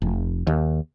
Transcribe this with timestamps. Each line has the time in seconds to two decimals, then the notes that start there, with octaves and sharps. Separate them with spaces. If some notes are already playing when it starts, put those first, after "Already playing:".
0.02 F1
0.47 D#2